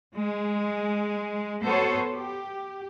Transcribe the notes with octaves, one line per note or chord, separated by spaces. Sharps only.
G#3
B3 F#4 A4 C5 C#5
G4